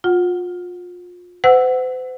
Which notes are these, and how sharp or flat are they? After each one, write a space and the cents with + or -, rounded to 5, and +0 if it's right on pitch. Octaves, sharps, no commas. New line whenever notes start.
F4 +30 F#5 +0
C5 -45 F#5 +0 E6 +0